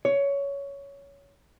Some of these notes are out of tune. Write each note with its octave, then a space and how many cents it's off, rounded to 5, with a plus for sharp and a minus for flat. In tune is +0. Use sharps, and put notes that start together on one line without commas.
C#5 +15